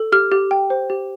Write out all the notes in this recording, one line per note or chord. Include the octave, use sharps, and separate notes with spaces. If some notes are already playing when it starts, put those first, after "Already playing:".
Already playing: A4
G4 F6
G4
G5
C5
G4